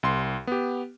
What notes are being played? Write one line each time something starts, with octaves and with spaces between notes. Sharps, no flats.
C2 C6
B3 G4